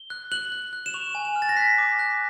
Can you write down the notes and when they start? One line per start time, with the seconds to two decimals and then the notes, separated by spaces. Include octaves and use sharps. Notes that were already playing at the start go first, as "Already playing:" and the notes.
Already playing: G7
0.10 F#6
0.32 F#6 F#7
0.52 F#6
0.73 F#6
0.86 E7
0.94 C#6 F7
1.15 G#5
1.25 E7
1.36 F6
1.42 A6
1.49 A#6
1.57 F#6 B6
1.78 D6
1.99 F#6